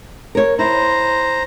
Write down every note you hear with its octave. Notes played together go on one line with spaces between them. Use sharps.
A#4 C#5
E4 C5 A#5